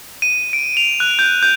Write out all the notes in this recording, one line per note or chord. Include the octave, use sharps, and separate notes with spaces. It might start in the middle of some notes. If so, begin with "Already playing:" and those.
D#7
D7
F7
F#6
G6
G6